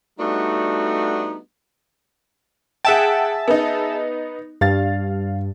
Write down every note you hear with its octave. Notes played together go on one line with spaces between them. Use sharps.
G3 A3 B3 D4 D#4 F#4
G#4 E5 F#5 G5 A5
B3 D#4
G2 F5 A6